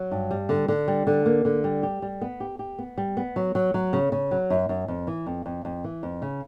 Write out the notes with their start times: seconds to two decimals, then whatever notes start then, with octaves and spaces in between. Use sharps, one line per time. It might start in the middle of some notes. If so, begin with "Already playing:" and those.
Already playing: F#3
0.11 G2
0.31 G3
0.49 D3
0.68 D3
0.88 G3
1.07 D3
1.26 A#3
1.45 D3
1.64 G3
1.83 G4
2.02 G3
2.22 B3
2.40 G4
2.59 G4
2.79 B3
2.98 G3
3.17 B3
3.36 F#3
3.55 F#3
3.74 F#3
3.93 C#3
4.12 C#3
4.31 F#3
4.50 F#2
4.69 F#2
4.88 F2
5.07 E3
5.27 F2
5.46 F2
5.65 F2
5.84 E3
6.03 F2
6.22 C#3